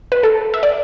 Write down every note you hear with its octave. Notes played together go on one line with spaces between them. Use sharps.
B4
A4
E5
D5